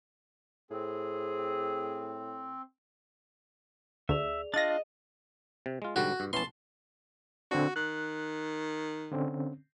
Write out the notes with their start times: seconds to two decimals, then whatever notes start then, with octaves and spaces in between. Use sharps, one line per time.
0.71 A2 C4 G#4
4.09 D2 G#4 D5 E5 F7
4.54 D4 F4 D#5 A6 A#6
5.66 C3
5.82 G#3 F4
5.96 G#2 D3 G3 F#4
6.20 G2
6.33 E3 B3 C#4 A5 C6
7.51 D3 C4 D4 F#4
7.76 D#3 F#6
9.11 D3 C4 C#4